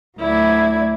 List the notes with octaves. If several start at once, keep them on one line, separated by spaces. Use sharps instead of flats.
D2 F#3 A3 E4 D5 G#6